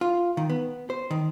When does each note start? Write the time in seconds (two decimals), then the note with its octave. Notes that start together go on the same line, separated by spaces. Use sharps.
0.01 F4
0.37 D#3
0.50 B3
0.90 C5
1.11 D#3